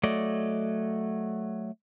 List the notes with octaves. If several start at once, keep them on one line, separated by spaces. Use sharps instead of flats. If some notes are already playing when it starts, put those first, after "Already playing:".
F#3 A3 D5 D#5